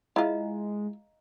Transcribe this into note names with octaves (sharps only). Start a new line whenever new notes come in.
G#3 E4 F4 D#5 F5 A#5